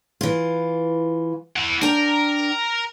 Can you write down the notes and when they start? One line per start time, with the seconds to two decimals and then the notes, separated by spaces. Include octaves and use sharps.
0.21 E3 F4
1.56 E4 F#5
1.82 D4 A#4 G5